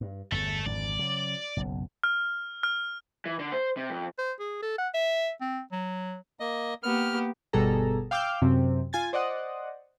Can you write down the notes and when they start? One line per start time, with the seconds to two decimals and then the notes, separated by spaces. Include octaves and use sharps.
0.01 G2
0.32 G1 E2 A3 A4
0.66 G#1 F2 D3 D5
0.99 C#3 F#3
1.57 F#1 B1
2.04 F6
2.63 F6
3.26 E3
3.39 D3
3.52 C5
3.77 C3
3.90 F2
4.18 C5
4.40 G#4
4.63 A4
4.78 F#5
4.94 E5
5.41 C4
5.72 F#3
6.40 A#3 D#5
6.83 A#3 B3 G4 F6
7.53 G1 B2 G3 G#4 A4 A#5
8.11 F5 G5 D6 E6 F6 G6
8.42 F#2 C3 C4
8.93 F4 G#5 G#6 A6
9.13 C5 D5 D#5 F#5 D#6